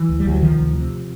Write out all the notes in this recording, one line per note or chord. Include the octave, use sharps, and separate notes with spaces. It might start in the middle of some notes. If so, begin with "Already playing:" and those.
Already playing: E3
D2
G3
D2 F#3
C3 D#3 F3
D2
C3